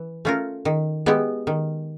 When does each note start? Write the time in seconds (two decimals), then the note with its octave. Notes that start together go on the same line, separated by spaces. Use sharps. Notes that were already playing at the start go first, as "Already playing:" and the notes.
Already playing: E3
0.25 A3 C#4 F4 A#4
0.65 D#3
1.06 G#3 B3 E4 G4
1.47 D#3